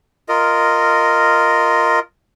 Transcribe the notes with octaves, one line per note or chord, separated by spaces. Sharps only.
F4 A#4 D#5